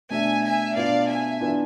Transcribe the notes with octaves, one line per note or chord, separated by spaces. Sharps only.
B2 A3 D4 E5 G#5
E5 G#5
B2 B3 D4 F4 D5 F5
E5 G#5
E3 B3 D4 F4